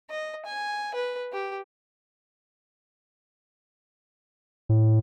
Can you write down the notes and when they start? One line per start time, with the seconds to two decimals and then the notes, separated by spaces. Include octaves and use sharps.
0.10 D#5
0.46 G#5
0.94 B4
1.33 G4
4.69 A2